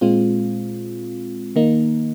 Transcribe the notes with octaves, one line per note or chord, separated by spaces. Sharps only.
A#2 G#3 C4 F4
D#3 A#3 D#4